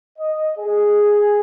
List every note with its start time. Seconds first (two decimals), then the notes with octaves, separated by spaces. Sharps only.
0.19 D#5
0.58 G#4